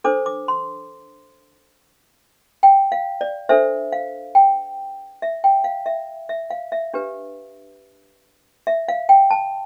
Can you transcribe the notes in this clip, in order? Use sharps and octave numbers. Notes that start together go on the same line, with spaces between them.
D4 A4 C5 D6
D6
C6
G5
F5
D5
D4 A4 C5 E5
F5
G5
E5
G5
F5
E5
E5
F5
E5
D4 G4 B4
E5
F5
G5
A5